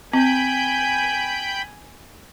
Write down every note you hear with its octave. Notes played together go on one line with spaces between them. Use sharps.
C4 G5 G#5 B5 G6